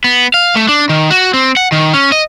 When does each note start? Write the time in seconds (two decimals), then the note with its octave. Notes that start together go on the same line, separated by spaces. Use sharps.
0.04 B3
0.34 F5
0.56 A3
0.69 D4
0.89 D#3
1.10 F#4
1.34 C4
1.57 F#5
1.72 D#3
1.94 C#4
2.12 D#5